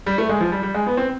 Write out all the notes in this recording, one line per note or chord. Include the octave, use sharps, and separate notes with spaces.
G3
A3
G#3
F3
G3
G3
G#3
B3
C4